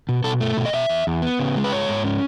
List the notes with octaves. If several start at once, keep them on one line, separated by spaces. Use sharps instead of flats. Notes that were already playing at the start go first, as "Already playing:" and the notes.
B2
B2 A4
A3
B2
D#5
B2 E5
E2
E2
B3
C#3
G#3
B4
G#2 C#5
G#2
C#4